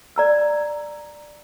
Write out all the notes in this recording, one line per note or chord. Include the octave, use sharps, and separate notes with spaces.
D5 A#5 E6